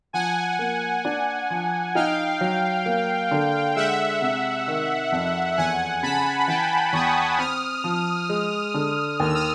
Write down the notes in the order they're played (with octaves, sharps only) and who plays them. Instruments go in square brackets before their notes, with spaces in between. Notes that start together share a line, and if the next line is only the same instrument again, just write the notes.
[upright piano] F3 [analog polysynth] F#5 G#5
[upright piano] A#3
D4
F3
[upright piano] D#4 [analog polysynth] F5 G5
[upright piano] F#3
A#3
D3
[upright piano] G#3 [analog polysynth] E5 F#5
[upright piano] C3
D#3
F2
[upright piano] E2 [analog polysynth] F#5 G#5
[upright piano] C#3 [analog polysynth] A5 B5
[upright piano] E3 [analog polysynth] G5 A5
[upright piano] E2 [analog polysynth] C#6 D#6
[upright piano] C4 [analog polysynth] D#6 F6
[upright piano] F3
G#3
D3
[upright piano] D#2 [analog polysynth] F6
[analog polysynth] E6
D#6 F6